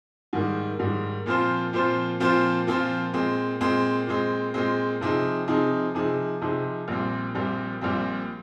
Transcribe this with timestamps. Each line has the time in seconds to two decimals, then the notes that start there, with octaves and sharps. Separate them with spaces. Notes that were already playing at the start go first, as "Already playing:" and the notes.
0.33 G#2 D#3 G3 A#3
0.79 G#2 D#3 G3 A#3
1.26 A#2 F3 C4 F4 C5
1.73 A#2 F3 C4 F4 C5
2.20 A#2 F3 C4 F4 C5
2.67 A#2 F3 C4 F4 C5
3.13 A#2 G#3 C4
3.60 A#2 G#3 C4
4.07 A#2 G#3 C4
4.54 A#2 G#3 C4
5.01 C3 F3 C4 D#4 G#4
5.48 C3 F3 C4 D#4 G#4
5.94 C3 F3 C4 D#4 G#4
6.41 C3 F3 C4 D#4 G#4
6.88 A#1 A#2 G3 C4
7.35 A#1 A#2 G3 C4
7.81 A#1 A#2 G3 C4